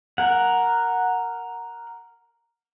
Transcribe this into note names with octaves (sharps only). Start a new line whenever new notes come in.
A#4 F#5